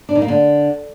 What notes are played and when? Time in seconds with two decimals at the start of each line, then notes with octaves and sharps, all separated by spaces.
0.09 D4
0.15 D#3
0.22 A#3
0.28 D3